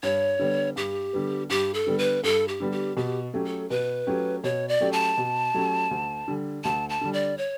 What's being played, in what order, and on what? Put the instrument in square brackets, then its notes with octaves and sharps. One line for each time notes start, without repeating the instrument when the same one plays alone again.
[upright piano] G2 [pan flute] C#5
[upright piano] D3 G3 B3
[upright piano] G2 [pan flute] G4
[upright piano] D3 G3 B3
[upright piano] G2 [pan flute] G4
[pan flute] A4
[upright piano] D3 G3 B3
[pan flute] B4
[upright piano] G2 [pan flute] A4
[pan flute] G4
[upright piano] D3 G3 B3
[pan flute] G4
[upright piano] B2 [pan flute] G4
[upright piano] F#3 A3 C#4 G4
[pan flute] A4
[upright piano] B2 [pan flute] B4
[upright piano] F#3 A3 C#4 G4
[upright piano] B2 [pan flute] C#5
[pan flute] D5
[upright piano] F#3 A3 C#4 G4
[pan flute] A5
[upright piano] B2
F#3 A3 C#4 G4
D2
D3 G3
[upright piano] D2 [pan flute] A5
[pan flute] A5
[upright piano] D3 G3
[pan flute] D5
C#5